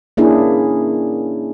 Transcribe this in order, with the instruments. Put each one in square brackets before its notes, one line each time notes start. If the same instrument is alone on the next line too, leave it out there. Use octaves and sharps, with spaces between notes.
[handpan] A#3 C#4 D4 E4 G#4